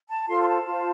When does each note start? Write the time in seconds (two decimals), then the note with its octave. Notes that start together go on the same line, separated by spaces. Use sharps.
0.08 A5
0.27 F4 A4 C5 C6
0.42 C6
0.47 A5
0.66 F4 C5